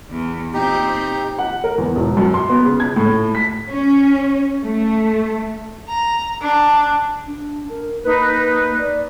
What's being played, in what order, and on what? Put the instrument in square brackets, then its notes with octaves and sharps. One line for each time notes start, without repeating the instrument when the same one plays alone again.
[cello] E2
[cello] A#2 C4 [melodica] D#4 G4
[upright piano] F#5
A#4
E2
E1
F#2
C6
B3
C#3
G#6
A2
B6
[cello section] C#4
A3
[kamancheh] A#5
D4
[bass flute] D4
A#4
[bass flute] A#3 [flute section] D#4 B4
[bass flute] D5